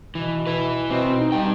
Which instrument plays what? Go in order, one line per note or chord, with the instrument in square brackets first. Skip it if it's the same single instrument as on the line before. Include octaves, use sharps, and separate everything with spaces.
[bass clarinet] B2 [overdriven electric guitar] E3
[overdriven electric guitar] E4 B4
[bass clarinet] B2 [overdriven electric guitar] C4
[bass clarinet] D#4
[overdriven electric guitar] G2 G5